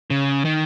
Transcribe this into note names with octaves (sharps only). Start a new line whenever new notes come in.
C#3
D#3